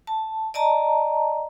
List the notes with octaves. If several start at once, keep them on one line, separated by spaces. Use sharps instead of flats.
A5
D5 D#5 A5 A#5